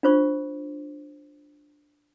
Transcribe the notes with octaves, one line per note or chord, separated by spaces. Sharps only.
D4 F4 C5 C#6